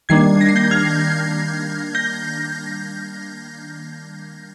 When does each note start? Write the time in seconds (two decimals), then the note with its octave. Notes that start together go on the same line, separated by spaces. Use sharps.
0.09 D#3 G3 A#3 D4 G#6 C7
0.41 A#6
0.49 C7
0.56 G6 A#6
0.71 F6 G#6
1.95 G6 A#6